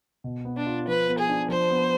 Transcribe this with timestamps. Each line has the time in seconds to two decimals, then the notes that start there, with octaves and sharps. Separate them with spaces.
0.24 B2
0.45 B3
0.55 D4
0.66 F4
0.87 F3 B4
1.08 B3
1.18 G#4
1.29 D4
1.49 F3 C5
1.70 B3